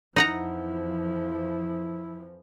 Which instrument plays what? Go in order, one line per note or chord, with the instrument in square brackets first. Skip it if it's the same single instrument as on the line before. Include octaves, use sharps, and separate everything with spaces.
[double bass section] F2 E3 F3 [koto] D#4 F#5 A#5 [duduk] E4